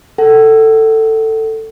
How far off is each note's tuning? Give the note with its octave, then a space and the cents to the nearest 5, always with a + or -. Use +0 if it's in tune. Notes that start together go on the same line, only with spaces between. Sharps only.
A4 +15 F#5 +35